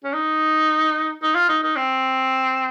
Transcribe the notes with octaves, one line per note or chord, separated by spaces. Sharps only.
C#4
D#4
D#4
F4
D#4
D#4
C4